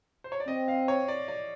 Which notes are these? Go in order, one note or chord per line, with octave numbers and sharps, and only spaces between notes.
C5
C#5
D5
C4 D#5
F5
C#5
D5
D5